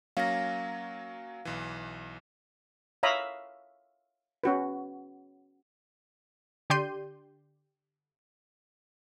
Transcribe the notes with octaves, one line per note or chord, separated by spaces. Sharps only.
F#3 A#3 C#4 F5 A#6
B1 E3
C#5 E5 F5 A#5 B5 D#6
C#4 F#4 B4
D3 G4 D5 C6 G6 D#7